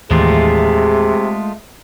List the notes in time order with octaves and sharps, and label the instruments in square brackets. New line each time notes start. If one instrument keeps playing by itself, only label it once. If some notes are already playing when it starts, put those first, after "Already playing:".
[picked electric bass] D#2 A2 E3 [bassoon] C3 [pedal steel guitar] G#3 A3 F4 [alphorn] G#4